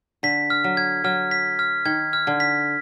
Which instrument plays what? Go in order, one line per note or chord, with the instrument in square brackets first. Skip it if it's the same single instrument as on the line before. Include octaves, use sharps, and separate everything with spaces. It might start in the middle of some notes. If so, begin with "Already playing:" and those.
[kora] D3 [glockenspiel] B6
[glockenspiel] F6
[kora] F#3
[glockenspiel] G#6
[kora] F#3 [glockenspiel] F6
[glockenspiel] B6
F6
[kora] D#3 [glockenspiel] G#6
[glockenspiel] F6
[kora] D3
[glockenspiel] B6